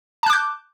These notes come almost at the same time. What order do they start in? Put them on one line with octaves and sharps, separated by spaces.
A5 F#6 D6 G6